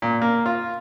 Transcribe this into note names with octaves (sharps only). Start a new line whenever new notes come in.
A#2
A#3
F4